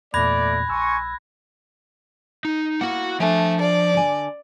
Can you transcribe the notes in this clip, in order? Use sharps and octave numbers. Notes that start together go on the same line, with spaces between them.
E2 A#2 A3 D5 B5 F#6 G#6 A#6
A#1 G#5 C6 C#6 E6
D#4
A#3 E4 F#4 F#5
F3 A3 D4 G#5
D5
D3 G#5